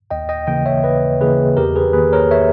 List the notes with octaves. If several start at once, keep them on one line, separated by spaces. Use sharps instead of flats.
D#2 D#5 G5
D#5 G5
C#3 E3 A#3 D#5 G5
C#5 E5
D#2 B4 D#5
C#3 E3 A#3 G#4 B4
E2 G4 A#4
G#4 B4
D#3 A#3 G#4 B4
A#4 C#5
C#5 E5